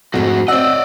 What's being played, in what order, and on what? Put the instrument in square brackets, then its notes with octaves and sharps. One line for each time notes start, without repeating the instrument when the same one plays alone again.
[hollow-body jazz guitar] B1 F2 G#2 [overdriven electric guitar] A3 F#4
[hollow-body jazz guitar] C4 F#5 [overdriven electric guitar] D5 D#5 [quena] E6